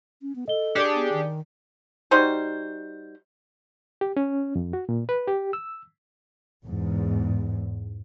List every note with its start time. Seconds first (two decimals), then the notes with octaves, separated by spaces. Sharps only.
0.22 C#4
0.36 B3
0.48 A4 D#5 G7
0.75 D4 G4 G#4 D5 D6 C#7
0.95 B3
1.12 D#3
2.11 G3 D#4 F#4 C5
4.01 G4
4.17 C#4
4.56 F2
4.73 F#4
4.89 A#2
5.09 B4
5.27 G4
5.53 E6
6.63 E2 G#2